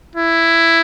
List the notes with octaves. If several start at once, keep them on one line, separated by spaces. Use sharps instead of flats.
E4